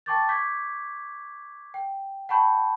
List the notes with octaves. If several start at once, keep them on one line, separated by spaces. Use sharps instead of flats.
G5 A5 C#6 D6 G6 A6
C#6 D6 G6 G#6 B6
G5
F#5 G5 A5 B5 C#6 G6